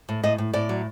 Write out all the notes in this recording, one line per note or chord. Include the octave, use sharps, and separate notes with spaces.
A2
A2 D#5
A2
A2 D5
F#3